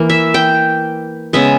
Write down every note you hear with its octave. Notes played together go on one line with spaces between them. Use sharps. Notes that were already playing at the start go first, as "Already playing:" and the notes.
Already playing: E3 A#3
E5
G5
C#3 G#3 B3 E5